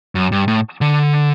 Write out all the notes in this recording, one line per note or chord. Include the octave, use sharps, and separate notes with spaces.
F#2
G2
A2
D3